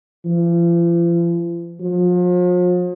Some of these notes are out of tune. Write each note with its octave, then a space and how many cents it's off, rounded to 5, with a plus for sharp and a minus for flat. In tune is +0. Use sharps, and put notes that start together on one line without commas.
F3 -40
F3 +40